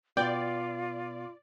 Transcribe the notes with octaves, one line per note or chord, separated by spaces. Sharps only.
B2 B3 F4 D5 G5